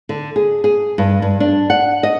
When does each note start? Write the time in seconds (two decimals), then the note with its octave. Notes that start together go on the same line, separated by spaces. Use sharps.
0.09 D3
0.36 G#4
0.64 G#4
0.98 G2
1.22 G2
1.40 D4
1.70 F#5
2.03 D#5